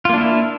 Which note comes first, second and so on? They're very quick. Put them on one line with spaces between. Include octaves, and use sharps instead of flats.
F4 A#3 D4 E4